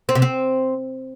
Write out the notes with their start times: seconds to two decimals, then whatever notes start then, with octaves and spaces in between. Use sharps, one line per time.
0.09 C4
0.15 C3
0.22 C4